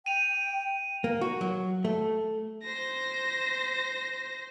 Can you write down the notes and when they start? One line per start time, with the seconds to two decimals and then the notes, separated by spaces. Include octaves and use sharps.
0.06 G5 D#7 F7
1.04 A#3
1.21 F#4
1.41 F#3
1.85 A3
2.64 C5 A#6